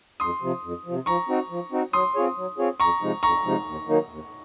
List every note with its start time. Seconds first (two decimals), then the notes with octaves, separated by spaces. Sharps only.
0.20 F2 C6 D#6
0.42 C3 F3
0.63 F2
0.85 C3 F3
1.06 F3 A#5 C#6
1.28 C4 D#4 F#4
1.50 F3
1.71 C4 D#4 F#4
1.93 F#3 C6 D#6
2.15 C4 F4 G#4 C#5
2.36 F#3
2.58 C4 F4 G#4 C#5
2.80 F2 A#5 C#6
3.01 C3 F3 G#3 D#4
3.23 F2 A#5 C#6
3.44 C3 F3 G#3 D#4
3.67 D#2
3.88 D#3 F#3 A#3 D#4
4.10 D#2